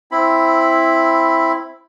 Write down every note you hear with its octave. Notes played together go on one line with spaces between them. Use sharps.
C4 E4 B5